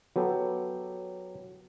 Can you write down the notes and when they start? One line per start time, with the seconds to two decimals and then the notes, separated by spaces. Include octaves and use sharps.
0.16 F#3 B3 G4 A4